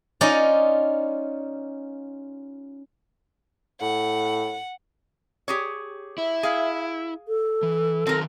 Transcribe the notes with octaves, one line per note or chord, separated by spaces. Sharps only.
C#4 D#4 F4 D5 A#5
A2 F#5
G4 G#4 C#5
E4 E5
G#4 F5
A4
E3
D#3 F#3 C4 A#4 A5